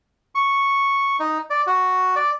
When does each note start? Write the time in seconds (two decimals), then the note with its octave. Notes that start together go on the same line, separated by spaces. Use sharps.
0.35 C#6
1.20 D#4
1.50 D5
1.67 F#4
2.16 D5